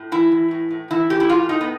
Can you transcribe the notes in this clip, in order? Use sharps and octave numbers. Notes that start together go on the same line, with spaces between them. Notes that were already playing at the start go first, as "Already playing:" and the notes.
Already playing: A2
E3 E4
E3
A2
A2
E3 E4
E3 G4
E4
A2 F4
A2 D#4
B3